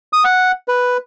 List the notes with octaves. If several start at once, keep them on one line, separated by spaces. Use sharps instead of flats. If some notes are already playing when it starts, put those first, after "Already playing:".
D#6
F#5
B4